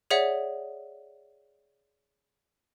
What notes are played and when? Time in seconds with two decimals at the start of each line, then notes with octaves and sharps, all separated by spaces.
0.11 G#4 C#5 D5 E5 F#5